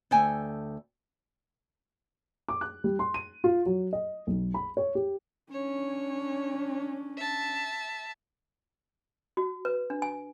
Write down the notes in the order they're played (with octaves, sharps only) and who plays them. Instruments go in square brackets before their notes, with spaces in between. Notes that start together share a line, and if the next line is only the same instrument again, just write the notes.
[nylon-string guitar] D2 A4 G5 G#5
[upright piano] D6
F#6
G3
C6
D#7
F4
F#3
D#5
B1
B5
C#5
G4
[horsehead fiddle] C#4 D4 [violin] C#5
[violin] E5 A5
[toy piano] F#4
B4
D4
G#5